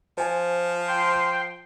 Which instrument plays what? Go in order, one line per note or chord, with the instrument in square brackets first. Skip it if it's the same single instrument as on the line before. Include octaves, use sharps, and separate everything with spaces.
[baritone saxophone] F3 [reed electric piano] C5 G#5
[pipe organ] G5 C6